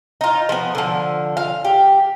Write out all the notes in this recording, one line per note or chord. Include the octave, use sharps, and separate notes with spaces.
D#4 F4
F3 B3
D3 F3
F5
G4